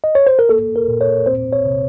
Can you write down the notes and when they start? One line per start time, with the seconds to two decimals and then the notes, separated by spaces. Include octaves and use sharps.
0.04 D#5
0.15 C#5
0.27 C5
0.39 A#4
0.49 A#3 A4
0.76 A#4
0.88 A#2
1.01 C#5
1.26 C4 C5
1.53 C#5
1.65 C3